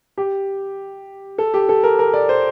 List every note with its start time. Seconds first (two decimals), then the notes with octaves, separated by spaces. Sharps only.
0.18 G4
1.38 A4
1.54 G4
1.69 A4
1.83 A#4
1.99 A#4
2.14 D5
2.29 C5